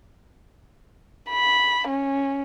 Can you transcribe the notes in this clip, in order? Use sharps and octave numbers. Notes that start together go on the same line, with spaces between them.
B5
C#4